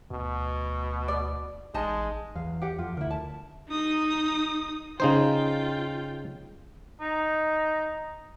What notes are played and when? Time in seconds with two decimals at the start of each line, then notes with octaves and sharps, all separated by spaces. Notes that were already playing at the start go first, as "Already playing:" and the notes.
0.11 D2 B2
1.08 D5
1.74 A1 G#3 D#4 D#5 A5
2.36 E2 F5
2.62 G4 F#5
2.79 F2 F4
2.97 D2 E4 A#4
3.10 A5
3.69 D#4 D#6
5.00 C#3 D#4 F4 C5 G5
7.01 D#4